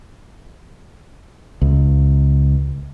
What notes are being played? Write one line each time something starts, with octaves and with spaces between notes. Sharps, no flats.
C#2